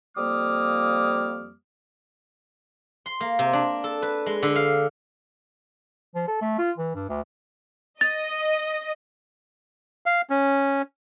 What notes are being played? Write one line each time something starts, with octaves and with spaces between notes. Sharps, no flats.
F2 G3 A#3 D6 D#6 F6
C6
A#3
C3
D4
A4
B4
G#3
D3
F5
F3
A4
A3
F4
E3
G2
D2
D#5 A6
F5
C#4